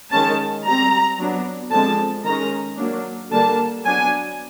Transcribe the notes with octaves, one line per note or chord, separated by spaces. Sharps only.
D#3 G#3 C#4 A5
G3 C4 A#5
F#3 B3 D4
D3 F3 G#3 C4 A5
D#3 G#3 C#4 A#5
F#3 A#3 D4
D3 G3 A#3 D4 A5
F#3 B3 D4 G#5